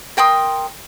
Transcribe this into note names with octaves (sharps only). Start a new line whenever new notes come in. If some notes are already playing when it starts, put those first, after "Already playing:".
A#4 G5 C6 D#6